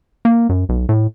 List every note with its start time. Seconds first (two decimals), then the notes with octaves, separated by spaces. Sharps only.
0.25 A#3
0.49 F#2
0.69 B1
0.89 A2